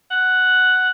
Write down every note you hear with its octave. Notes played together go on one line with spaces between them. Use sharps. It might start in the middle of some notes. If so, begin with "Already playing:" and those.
F#5